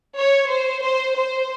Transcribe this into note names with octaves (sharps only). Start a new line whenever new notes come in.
C#5
C5
C5
C5